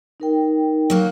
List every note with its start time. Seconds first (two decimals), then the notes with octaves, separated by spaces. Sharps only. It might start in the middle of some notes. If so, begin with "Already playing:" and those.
0.20 D#4 A#4 G5
0.90 F#3 A#3 F#4